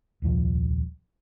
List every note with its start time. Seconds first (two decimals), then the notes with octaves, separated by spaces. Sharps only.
0.22 D#1 C2 F3